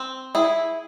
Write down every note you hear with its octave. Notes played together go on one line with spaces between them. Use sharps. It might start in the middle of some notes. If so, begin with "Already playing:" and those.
Already playing: C4
E4 G#4